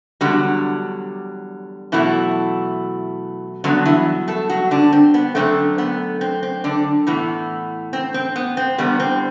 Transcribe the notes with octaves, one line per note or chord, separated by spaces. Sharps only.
E2 D3 F#3 G3 F#4
B2 E3 F#3 A3 E4
G2 D3 F#3 B3 D4
E3 E4
A3 A4
F#3 F#4
D3 D4
C4
B3
F#2 D3 A3 C4
B3
C4
C4
D3 D4
A2 E3 B3
C4
C4
B3
C4
E2 D3 G3 B3
C4